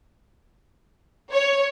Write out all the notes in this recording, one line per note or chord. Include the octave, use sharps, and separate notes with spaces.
C#5